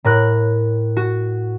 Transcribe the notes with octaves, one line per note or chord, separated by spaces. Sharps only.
A2 A#4 F#6
F#4